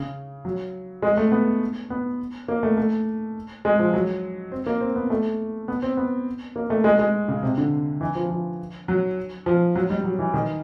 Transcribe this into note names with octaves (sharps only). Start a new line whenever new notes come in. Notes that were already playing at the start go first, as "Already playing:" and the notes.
Already playing: C#3
F#3
G#3
A3
B3
B3
A#3
A3
A3
G#3
F3
F#3
C4
A#3
C4
B3
A3
B3
C4
B3
A#3
A3
G#3
G#3
C#3
C3
D3
E3
F3
F3
F#3
F3
F#3
G3
F#3
E3
D#3